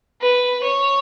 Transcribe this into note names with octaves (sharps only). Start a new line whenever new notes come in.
B4
C#5